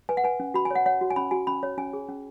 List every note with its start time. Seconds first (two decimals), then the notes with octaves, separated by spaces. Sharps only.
0.09 B4 G#5
0.17 F#5
0.24 B4 G#5
0.40 C#4
0.54 F#4 B5
0.65 G#5
0.71 C#5 F#5
0.86 C#5 F#5
1.01 F#4
1.10 G#5
1.16 C#4 B5
1.31 F#4 G#5
1.47 C#4 B5
1.63 C#5
1.78 C#4 G#5
1.93 G#4
2.09 C#4